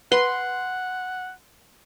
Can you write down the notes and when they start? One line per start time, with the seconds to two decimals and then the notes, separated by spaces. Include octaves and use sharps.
0.12 B4 F#5 C6